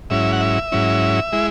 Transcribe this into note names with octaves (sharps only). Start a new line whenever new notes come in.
G#2 F#3 C#4 E4 E5
F#5
E5
G#2 F#3 C#4 E4
G#3 E4